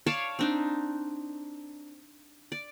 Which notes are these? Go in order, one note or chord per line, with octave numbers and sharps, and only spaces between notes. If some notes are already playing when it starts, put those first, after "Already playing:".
C#5 D5 F5 A5
C4 D4 D#4
D5